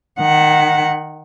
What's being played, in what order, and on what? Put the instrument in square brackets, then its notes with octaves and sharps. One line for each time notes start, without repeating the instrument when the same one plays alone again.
[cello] D#3 F#5